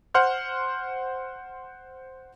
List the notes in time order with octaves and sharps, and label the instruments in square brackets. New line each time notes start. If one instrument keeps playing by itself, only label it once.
[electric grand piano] C5 F#5 C6 F6 G6